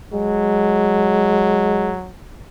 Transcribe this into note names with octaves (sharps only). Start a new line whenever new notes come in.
F#3 G#3